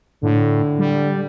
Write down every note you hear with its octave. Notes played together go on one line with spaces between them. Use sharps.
A2 D3
G3